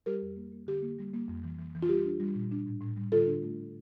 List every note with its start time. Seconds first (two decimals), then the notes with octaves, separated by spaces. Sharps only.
0.06 G3 G4 A#4
0.22 F2
0.36 A#3
0.52 A#3
0.67 D3 G4
0.82 A#3
0.99 G3
1.13 A#3
1.28 F2
1.44 E3
1.59 E3
1.75 E3
1.83 F4
1.89 G3 G4
2.05 D4
2.20 G3
2.35 A#2
2.51 D4
2.66 A2
2.81 A2
2.97 G3
3.12 D3 F4 A4
3.27 D4
3.42 A3